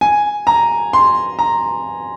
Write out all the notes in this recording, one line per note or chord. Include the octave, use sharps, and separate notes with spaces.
G#5
A#5
C6
A#5